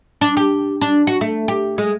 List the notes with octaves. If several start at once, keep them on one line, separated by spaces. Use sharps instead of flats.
D4
G4
D4
F#4
A3
G4
G#3